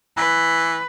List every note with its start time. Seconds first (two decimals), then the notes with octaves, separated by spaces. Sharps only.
0.17 E3 B4